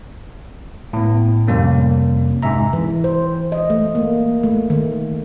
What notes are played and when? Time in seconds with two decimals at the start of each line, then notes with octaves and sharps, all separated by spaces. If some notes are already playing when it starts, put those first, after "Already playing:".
0.93 A2 B3
1.48 F2 C3 G3 A#3 C#4
2.43 G#2 C3 E5 A#5
2.73 E3
3.04 C5
3.52 D#5
3.70 A3
3.95 A#3
4.43 A3
4.70 D#3